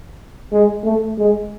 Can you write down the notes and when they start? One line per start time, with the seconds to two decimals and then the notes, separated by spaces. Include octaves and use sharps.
0.52 G#3
0.84 A3
1.18 G#3